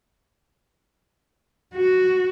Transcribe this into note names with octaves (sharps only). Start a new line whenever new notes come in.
F#4